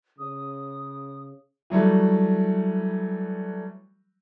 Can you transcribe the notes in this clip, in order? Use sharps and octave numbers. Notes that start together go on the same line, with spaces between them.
C#3 D#6
E3 F#3 G3 A3